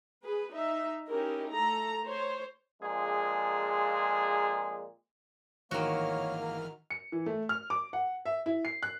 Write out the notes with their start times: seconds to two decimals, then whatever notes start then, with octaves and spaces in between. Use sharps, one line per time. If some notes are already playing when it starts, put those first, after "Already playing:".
0.24 G#4 B4
0.53 D#4 E5
1.08 C#4 D#4 E4 G4 A#4
1.52 A3 A4 A#5
2.05 C5 C#5
2.81 F2 A#2 G#3 G#4
5.71 G#1 D#3 E3 A#3 F#4 C#5 F6
6.40 A#4
6.90 C#7
7.12 E3
7.26 A3
7.49 F6
7.70 D6
7.93 F#5
8.25 E5
8.46 E4
8.65 C7
8.83 F#6